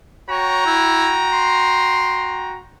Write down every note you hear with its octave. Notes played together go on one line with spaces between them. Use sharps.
F#4 C#5 G5 A#5
E4
C6